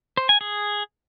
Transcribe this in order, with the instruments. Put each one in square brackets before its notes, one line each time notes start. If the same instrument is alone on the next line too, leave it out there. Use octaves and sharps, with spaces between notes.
[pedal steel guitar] C5
G#5
G#4